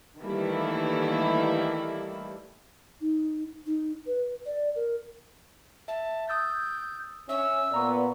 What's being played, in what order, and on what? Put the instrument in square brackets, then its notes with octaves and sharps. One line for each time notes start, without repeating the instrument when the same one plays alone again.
[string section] D#3 E3 G3 A3 A#3 E4
[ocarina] D#4
D#4
B4
D5
A#4
[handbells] E5 [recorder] A5
[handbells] D#6 E6 A6 [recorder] G6
[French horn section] C#4 [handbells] E5 [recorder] E6
[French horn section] A#2 B3 [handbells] D5 A#5 C#6